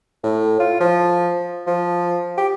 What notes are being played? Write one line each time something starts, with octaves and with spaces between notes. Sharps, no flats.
A2
F4
F3
F3
G4